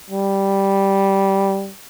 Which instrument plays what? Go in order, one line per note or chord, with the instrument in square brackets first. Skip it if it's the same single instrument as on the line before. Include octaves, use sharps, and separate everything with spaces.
[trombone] G3